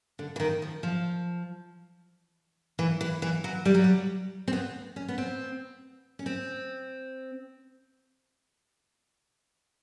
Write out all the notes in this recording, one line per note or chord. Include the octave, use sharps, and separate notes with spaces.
D3
E3
D#3
F3
F3
E3
E3
E3
F#3
G3
F#3
G3
C4
B3
C#4
B3
C4
C#4
C4